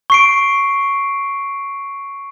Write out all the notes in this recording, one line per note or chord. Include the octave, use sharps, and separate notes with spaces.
C#6 C7 D7